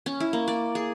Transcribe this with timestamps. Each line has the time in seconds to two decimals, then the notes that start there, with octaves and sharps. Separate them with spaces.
0.06 C#4
0.20 E4
0.33 A#3
0.48 D5
0.75 G#4